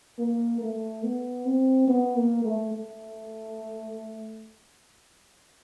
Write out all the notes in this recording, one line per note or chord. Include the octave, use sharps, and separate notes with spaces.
A#3
A3
B3
C4
B3
A#3
A3
A3